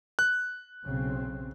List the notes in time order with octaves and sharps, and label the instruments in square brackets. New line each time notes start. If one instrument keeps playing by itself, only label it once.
[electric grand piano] F#6
[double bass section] B1 C#3 C4